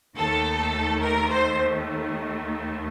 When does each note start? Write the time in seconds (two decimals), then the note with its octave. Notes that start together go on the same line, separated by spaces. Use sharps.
0.16 D#2 D#3 A3 A4
1.02 A#4
1.30 C5